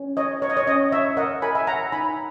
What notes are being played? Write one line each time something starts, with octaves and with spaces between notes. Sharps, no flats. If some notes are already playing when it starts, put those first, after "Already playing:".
Already playing: C#4
C#5 D#5
C#5
D#5
C#5
C#4 D#5
C#5 E5
A#4 D#5 F#5
A#4 G#5 B5
E5 G#5
C#5 F#5 A#5
D#4 G#5 B5